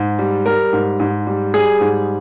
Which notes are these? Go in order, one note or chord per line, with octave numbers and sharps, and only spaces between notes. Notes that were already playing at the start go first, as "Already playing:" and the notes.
Already playing: G#2
G3
G3 A#4
G#2
G#2
G3
G3 G#4
G#2